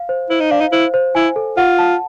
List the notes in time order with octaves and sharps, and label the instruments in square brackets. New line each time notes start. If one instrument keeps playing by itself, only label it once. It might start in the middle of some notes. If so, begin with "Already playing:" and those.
Already playing: [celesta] F5
C5
[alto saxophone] E4 [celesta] C5
[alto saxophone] D#4
[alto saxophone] D4 [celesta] F5
[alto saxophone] D#4
[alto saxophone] E4 [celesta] C5
[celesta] C5
[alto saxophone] E4 [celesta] G#5
[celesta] A4
[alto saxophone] F4 [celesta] F#5
[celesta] A5